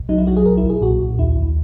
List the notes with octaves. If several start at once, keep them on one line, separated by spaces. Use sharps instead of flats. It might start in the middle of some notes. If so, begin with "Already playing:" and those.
Already playing: B1
F#3 D#4
E4
F#3 F#4
G#4
B1 A#4
E4
B1
G#4
A#2 F#4
B1
D#2 E4
D#2